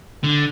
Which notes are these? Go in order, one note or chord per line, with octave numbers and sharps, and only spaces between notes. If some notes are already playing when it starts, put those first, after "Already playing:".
D3